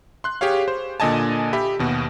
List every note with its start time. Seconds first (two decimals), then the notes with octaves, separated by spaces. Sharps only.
0.24 C6 F#6
0.41 G4 G#4 C#5 F5
0.68 C5
1.00 A#2 D3 D#5 G#5 A5
1.53 G4 E5 B5
1.79 D#2 B2 F#4